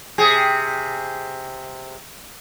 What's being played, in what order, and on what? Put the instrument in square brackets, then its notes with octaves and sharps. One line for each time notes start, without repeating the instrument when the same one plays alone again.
[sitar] C3 G#4